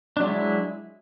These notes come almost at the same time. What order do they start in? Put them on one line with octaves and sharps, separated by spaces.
D4 F#3 G#3 E4